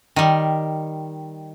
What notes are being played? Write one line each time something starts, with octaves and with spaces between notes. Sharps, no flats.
D#3 G3